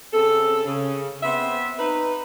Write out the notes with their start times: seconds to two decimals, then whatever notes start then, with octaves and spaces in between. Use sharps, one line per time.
0.13 C#3 C4 A4
0.66 C#3
1.23 B3 C4 C5 E5
1.79 D#4 B4